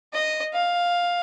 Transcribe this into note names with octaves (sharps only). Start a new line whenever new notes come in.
D#5
F5